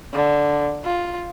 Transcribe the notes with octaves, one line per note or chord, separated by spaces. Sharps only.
D3
F4